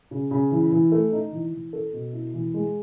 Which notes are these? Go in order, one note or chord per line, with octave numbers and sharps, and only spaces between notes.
C#3
C#3
E3
E3
A3
D#4
E3
E3
A4
B2
E4
E3
G#3